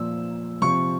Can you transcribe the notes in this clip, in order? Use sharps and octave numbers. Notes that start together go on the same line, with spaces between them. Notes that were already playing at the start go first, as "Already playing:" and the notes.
Already playing: A#2 F3 E6
C3 F3 C#6